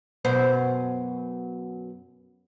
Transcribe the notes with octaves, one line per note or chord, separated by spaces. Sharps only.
F#2 B2 C5